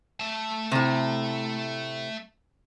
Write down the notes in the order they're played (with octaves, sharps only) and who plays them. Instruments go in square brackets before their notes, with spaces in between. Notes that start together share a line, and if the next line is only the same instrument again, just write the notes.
[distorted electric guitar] A3 A5
[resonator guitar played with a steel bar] A2 C3